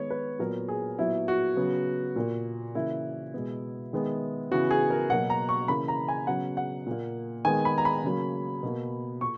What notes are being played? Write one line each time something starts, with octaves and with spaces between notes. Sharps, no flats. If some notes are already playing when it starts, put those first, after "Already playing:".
Already playing: D#3 G#3 B3 C#5
B4
A#2 F#3 B3 A#4
G#4
A#2 F#3 B3 E4
F#4
C#3 F#3 B3
A#2 A#3
C#3 E3 A#3 E4
B2 G#3 B3
D#3 G#3 B3
C#3 E3 B3 F#4
G#4
A#4
B2 F#3 A#3 F#5
A#5
C#6
C#3 E3 A#3 B5
A#5
G#5
C#3 F#3 B3 F#5
F#5
A#2 A#3
D#3 G#3 B3 G#5
B5
A#5
B5
C#3 F#3 A#3
B2 A#3
A#2 C#6